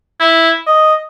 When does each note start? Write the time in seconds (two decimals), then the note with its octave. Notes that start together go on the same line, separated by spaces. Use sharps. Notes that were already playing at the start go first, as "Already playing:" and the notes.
0.20 E4
0.67 D#5